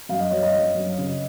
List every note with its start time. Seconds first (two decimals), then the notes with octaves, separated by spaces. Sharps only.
0.09 F#2 F5
0.20 D#5
0.31 F#2 C#5
0.43 D#5
0.54 F#2
0.75 F#2
0.98 C#3